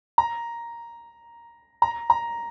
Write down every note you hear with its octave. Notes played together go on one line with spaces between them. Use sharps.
A#5
A#5
A#5